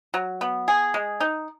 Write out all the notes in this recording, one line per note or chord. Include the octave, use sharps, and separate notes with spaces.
F#3
B3
G#4
G#3
D#4